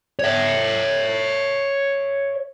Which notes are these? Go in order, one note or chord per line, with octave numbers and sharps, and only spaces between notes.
C#5 E5